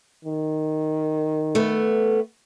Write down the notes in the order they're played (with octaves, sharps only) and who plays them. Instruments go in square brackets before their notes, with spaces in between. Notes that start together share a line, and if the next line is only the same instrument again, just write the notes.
[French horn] D#3
[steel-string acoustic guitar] A3 B3